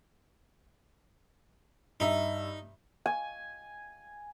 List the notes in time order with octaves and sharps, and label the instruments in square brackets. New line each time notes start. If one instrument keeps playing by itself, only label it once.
[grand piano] G2 E5 [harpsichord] D#4
[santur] G#5